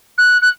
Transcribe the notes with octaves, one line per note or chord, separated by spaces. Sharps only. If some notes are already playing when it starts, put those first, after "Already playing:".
F#6
F#6